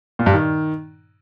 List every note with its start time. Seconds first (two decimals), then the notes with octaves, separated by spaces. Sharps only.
0.19 A#2
0.26 G2
0.33 D#3